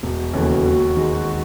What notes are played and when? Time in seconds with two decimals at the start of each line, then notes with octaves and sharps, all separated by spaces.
0.03 E1 F#4
0.33 D#2 C#3 E3 A3
0.66 D#2
0.96 D#3 G#3